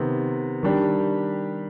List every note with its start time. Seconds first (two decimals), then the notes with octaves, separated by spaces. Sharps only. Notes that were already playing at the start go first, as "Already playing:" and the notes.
Already playing: C3 D#3 B3
0.63 D#3 G3 D4 G4